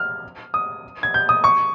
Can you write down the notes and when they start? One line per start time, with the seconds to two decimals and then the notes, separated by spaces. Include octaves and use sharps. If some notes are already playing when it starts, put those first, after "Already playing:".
Already playing: F6
0.54 D#6
1.03 G#6
1.14 G6
1.29 D#6
1.44 C#6